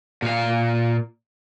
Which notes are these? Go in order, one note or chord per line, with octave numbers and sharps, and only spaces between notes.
A#2 F5